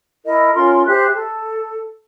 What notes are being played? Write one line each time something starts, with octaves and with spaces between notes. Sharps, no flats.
E4 A#4 D#5
C#4 F4 A#4 C6
G4 C5 E5 F#6
A4